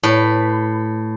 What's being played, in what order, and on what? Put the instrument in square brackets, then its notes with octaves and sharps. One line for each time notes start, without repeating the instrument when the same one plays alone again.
[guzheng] A2 B4